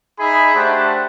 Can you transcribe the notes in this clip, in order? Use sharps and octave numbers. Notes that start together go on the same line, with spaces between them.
D#4 G#4 E5 B5
A3 D4 G4 C5 F#5 A5